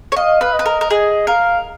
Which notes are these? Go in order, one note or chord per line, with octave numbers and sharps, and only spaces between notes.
C#5
D#5 F5
B4
D#5
B4
A#4
A#4
G#4 D#5
A#4 F5